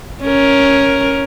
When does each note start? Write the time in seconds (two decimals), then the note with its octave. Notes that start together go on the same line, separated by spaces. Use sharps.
0.23 C#4 A#4